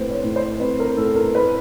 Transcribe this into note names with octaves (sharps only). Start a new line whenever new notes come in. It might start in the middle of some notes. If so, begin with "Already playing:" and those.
Already playing: A2 C4 B4 C5
C#5
A2
C5
C4 B4
A#4
A2 A4
A#4
A2 B4